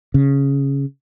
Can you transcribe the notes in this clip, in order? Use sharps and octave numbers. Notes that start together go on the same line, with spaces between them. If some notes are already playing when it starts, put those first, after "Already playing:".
C#3